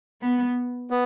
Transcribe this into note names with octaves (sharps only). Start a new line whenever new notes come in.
B3
B3